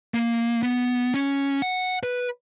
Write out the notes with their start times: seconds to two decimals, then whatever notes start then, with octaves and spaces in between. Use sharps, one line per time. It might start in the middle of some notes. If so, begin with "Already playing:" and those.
0.14 A#3
0.63 B3
1.14 C#4
1.62 F#5
2.03 B4